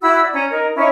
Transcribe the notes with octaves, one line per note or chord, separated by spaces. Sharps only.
E4 F#4 B5 E6
D5
C#4 A#5
D#4 A#4
C#4 D#4 E4 C#5